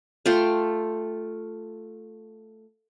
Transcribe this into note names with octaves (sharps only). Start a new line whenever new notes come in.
A3 F4 G5 C6